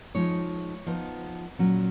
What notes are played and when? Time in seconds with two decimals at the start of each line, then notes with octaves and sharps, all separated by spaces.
0.15 F3 G#3 D#4 C#5
0.87 F3 B3 D#4
1.59 A#2 F#3 C#4